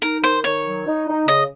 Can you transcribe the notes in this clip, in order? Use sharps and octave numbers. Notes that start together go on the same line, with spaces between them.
D#4 A#4
D#3 C5
D#3 C#5
F#3
D#4
D#4
C#3 D#5